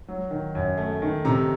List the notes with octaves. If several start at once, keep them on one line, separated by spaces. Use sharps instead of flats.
F#3
D#3
F#2
A3
D#3
C3 A#5